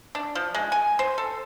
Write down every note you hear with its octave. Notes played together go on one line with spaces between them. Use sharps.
D4
F3
G#3
G#5
C5
A4